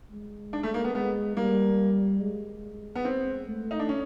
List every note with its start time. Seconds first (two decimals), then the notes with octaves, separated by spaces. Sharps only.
0.11 G#3
0.53 D4
0.63 A3
0.74 A#3
0.84 B3
0.95 G#3 B3
1.36 G3 A#3
2.21 G#3
2.95 B3
3.05 C4
3.47 A3
3.71 D#4
3.79 D4
3.89 C#4